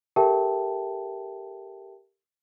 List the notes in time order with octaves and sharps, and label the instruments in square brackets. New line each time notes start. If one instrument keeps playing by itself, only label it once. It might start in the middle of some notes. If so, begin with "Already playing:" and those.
[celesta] G4 A4 A#4 E5 G5 A5